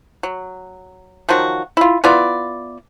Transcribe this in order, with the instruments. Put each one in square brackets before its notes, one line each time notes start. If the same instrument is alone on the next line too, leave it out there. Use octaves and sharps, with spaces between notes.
[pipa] F#3
D#3 F3 F#3 F#4
E4 F4
B3 E4 F4 D5